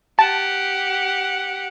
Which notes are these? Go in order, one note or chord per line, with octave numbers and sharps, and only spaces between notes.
G4 F#5 A5